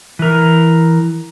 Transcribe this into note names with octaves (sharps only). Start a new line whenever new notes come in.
E3 A#4